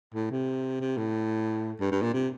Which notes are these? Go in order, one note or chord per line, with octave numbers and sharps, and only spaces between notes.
A2
C3
C3
A2
G2
G2
A#2
C3